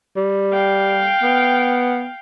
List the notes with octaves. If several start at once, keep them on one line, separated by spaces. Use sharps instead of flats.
G3
F5 G5
B3